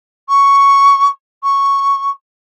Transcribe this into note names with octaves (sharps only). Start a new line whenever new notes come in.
C#6
C#6